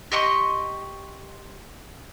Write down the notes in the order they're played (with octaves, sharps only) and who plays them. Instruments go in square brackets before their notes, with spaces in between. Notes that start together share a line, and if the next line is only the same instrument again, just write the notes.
[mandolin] G4 D#5 C6 C#6